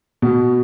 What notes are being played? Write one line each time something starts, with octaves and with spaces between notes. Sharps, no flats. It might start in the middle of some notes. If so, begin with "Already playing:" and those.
B2